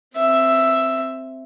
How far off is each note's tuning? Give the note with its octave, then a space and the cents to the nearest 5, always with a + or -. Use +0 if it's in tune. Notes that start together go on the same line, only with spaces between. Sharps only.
C4 +0 E5 +5